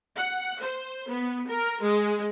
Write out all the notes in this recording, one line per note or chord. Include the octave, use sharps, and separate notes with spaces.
F#5
C5
B3
A#4
G#3